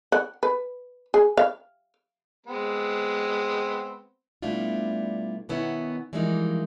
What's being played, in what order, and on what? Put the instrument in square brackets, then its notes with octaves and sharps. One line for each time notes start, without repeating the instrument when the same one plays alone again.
[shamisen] F#5
B4
G#4
F5
[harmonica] G#3 B3 C4
[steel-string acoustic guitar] B2 G3 A3 D4 E4 F4
B2 D#3 B3 C#4 E4 F#5
E3 F3 G3 G#3 A#3 D#4